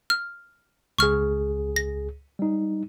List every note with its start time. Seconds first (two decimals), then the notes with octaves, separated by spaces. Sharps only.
0.10 F6
0.99 C#2 G#4 C#6 F6
1.76 A#6
2.39 G3 D#4